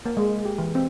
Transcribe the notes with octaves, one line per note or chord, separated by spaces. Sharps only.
A#3
G#3
G4
E3
C4